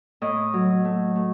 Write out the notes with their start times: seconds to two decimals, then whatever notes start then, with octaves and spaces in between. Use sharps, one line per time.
0.22 A2 D#5
0.53 F#3
0.85 A3
1.15 A3